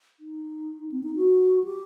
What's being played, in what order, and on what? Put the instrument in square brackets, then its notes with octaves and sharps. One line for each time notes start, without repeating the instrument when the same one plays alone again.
[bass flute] D#4
C4
D#4
F#4
G4